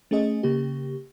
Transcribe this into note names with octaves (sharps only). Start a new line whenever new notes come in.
A3 C#4 G#4 D#5
C#3 A#3 G4